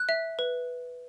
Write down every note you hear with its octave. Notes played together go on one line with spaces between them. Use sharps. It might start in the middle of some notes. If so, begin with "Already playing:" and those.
Already playing: F#6
E5
B4